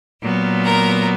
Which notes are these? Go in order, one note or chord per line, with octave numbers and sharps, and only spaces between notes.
A#2 F#3 B3
A#4 A#5